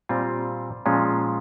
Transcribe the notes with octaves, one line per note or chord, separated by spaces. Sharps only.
A#2 G3 C4 F4
A#2 F3 G#3 C#4 F4